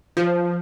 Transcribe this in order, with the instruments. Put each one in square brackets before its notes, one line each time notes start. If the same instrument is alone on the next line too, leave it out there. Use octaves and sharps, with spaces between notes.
[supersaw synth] F3